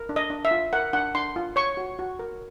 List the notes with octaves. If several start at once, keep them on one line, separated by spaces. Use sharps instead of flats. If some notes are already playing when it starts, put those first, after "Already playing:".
Already playing: A#4
D4
D#5
D4
E5
F4
A#4 F#5
D4 F#5
D4 C6
F4
C#5 C#6
F#4
F#4
A#4